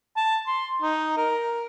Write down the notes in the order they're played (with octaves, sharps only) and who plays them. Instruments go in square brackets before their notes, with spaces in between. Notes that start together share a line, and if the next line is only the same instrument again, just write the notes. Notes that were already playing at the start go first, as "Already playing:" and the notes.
[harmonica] A5
C6
D#4
A#4